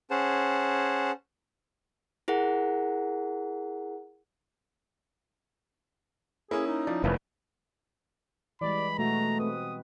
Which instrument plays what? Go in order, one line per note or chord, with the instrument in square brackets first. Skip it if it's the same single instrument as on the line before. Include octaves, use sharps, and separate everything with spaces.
[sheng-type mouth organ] C#4 G#4 C5 F#5 A5
[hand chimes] E4 G#4 A#4 F#5
[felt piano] A#3 [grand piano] C#4 E4 [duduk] G#4
[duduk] D#4
[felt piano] F3 D5
[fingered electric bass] F1 [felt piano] E2 A3 A#3 [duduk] B4
[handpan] E3 G3 G#3 [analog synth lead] D5 [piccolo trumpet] B5
[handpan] B2 G#3 F#4 [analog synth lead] A3 [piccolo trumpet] A#5
[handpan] C4 B4 [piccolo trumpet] D#6